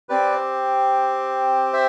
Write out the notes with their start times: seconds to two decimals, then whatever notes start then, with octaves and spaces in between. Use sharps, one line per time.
0.09 C4 G4 B4 D5
1.73 C5 E5